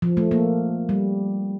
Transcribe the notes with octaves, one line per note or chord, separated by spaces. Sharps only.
F3
A3
A#3
G3